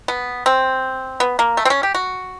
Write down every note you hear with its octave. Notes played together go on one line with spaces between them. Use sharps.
B3
C4
B3
A#3
A3
C4
C#4
G4
F#4